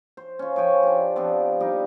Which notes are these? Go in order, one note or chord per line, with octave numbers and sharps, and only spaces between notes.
C5
C#4 F4
F3 C#5 G5 G#5
D4 G4
F3 B3 C4 D4
G3 D#4 G4 D#5